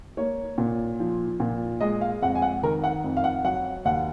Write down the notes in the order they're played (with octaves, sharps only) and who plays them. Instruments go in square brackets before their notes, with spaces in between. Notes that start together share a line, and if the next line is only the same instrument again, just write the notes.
[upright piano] A#3 C#5
A#2
F3
A#2
G#3 D#5
F5
F2 F#5
G#5
F#5
D#3 A#4
F#5
F2
F5
F#5
F#3 F#5
D#2 F#5